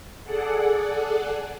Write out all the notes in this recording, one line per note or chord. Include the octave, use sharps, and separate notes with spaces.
G#4 A4 D5 F#5